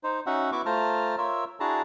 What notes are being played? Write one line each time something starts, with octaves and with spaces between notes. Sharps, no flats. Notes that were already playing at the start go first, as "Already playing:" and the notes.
D#4 C5
C#4 D#4 F#4 E5 F#5
B3 E4 F#4 E5 C#6 D6
A3 F4 C5 A5 A#5 F6
F4 A#4 C#5 E5 E6
D4 E4 F#4 G#4 A5 A#5